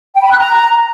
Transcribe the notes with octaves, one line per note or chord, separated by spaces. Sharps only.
G5
B5
F#6
A#5